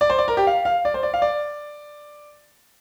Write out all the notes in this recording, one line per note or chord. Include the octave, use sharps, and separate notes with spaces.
D5
C5
D5
A#4
G4
F5
F5
D5
C5
D5
F5
D5